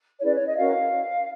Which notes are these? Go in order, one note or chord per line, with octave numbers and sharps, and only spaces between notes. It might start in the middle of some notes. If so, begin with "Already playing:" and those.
C#5
C#4 E4 G#4 B4 D5
C#5
D#5
C#4 F#4 A#4 C#5 F5